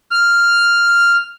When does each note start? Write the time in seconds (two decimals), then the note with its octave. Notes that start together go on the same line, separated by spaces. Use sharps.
0.11 F6